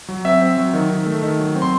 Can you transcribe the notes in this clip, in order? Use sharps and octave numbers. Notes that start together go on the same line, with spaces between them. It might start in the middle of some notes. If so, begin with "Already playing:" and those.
F#3
C4 E5
C4
F#3
D#3
D#3
A3
D#3
F#3
C4
C6